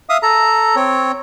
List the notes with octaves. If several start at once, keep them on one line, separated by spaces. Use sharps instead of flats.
E5 F5 D#6
A4 A#5
C4 C#5